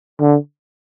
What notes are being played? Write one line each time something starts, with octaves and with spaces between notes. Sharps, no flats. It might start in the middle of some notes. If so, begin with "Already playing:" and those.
D3